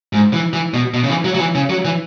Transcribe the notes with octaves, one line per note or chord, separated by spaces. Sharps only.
G#2
E3
E3
B2
B2
C#3
E3
F#3
F#3
E3
C#3
F#3
E3